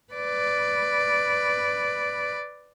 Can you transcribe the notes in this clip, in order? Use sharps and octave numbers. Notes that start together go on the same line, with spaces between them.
B4 D5